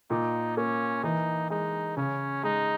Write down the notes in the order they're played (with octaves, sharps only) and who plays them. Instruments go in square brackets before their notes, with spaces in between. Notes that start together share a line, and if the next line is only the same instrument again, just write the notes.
[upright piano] A#2 [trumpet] D#4
[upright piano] A#3 [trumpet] C#4
[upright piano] E3 [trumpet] D#4
[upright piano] G#3 [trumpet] D#4
[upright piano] C#3 [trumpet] C#4
[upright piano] G#3 [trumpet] D#4